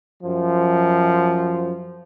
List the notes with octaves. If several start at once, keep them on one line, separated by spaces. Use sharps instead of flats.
F#2 F3